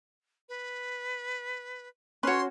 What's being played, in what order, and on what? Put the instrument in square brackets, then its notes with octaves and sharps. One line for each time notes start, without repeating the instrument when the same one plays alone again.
[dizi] B4
[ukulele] C#4 F#4 [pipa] B4 C#5 [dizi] C6